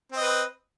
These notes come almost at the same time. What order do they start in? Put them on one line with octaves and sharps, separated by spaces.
C4 D#5 B4